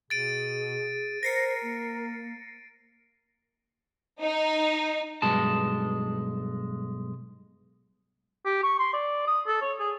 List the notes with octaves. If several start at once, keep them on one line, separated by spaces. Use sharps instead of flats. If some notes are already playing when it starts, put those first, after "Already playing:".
B2 G#4 A6 D7 D#7
A#4 C5 A#6 C7 C#7
A#3
D#4
B1 G2 G#3 A5
G4
C#6
C6
D5
D#6
A4
C#5
G#4